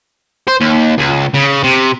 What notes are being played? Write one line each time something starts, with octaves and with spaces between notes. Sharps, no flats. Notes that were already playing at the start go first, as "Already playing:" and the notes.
C5
D#2
C#2
C#3
C3